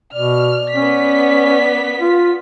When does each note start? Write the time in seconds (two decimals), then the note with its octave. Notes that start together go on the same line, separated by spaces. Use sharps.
0.14 B2 D5 F6
0.75 B3 C#4 B6
2.01 F4